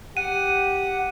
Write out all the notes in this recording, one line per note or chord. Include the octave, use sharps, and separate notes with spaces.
G4 F#5 D#7